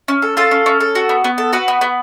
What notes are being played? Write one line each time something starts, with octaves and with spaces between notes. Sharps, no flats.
C#4
A4
F4 A4
C#4
C#4
A4
F#4
B3
B3
A4
F#4 B4
B3
B3